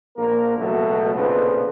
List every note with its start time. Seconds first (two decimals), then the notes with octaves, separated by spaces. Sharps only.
0.17 A#1 A#3 A#4
0.58 C#2 B2 F#3 A3
1.14 B1 F2 A#2 C#3 B3 B4